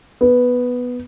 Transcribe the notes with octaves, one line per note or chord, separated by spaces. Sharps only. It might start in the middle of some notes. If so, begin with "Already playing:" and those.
B3